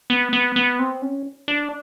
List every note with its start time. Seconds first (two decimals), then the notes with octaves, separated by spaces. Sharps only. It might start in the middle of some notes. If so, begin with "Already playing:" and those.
0.10 B3
0.33 B3
0.56 B3
0.79 C4
1.02 C#4
1.48 D4